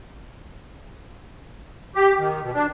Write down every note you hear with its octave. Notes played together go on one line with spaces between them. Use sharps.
G4
D#3
B2
D4